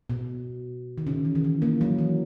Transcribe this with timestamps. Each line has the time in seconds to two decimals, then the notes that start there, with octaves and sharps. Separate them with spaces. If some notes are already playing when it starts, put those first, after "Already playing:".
0.10 B2
0.98 D#3
1.07 C#3
1.25 E3
1.35 D#3
1.44 E3
1.62 A#3
1.81 F#3
1.99 E3